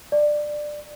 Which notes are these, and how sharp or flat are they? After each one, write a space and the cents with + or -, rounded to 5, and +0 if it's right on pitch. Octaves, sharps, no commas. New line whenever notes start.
D5 +15